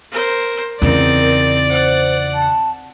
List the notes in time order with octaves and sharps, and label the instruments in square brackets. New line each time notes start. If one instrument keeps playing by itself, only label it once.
[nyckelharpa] A#4 C5
[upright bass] E2 C#3 [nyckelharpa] C4 D#4 [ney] A#4 [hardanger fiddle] D5
[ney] C5 [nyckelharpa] F#5
[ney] A5